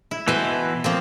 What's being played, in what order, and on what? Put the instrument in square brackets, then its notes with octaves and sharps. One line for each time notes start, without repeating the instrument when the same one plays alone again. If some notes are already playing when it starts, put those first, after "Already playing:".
[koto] E4
[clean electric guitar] B2 E3 [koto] B4 C5
[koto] F3 A#3 C4